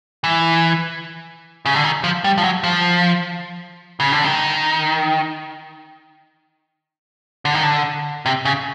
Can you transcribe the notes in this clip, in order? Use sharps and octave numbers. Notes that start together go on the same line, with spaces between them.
E3
C#3
D3
D#3
F3
G3
F3
F#3
F3
C#3
D3
D#3
D3
D#3
D3
C3
C#3